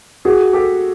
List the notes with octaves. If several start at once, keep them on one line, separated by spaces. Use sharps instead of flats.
F#4 G#4
G4 A4